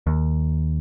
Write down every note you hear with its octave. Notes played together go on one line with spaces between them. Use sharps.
D#2